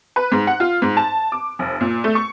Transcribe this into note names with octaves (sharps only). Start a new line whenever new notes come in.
B4
G#2
F#5
F4
G#2
A5
D6
F1
A#2
A3
C#6